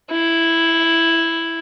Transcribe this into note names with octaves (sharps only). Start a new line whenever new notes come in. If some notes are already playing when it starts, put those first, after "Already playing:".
E4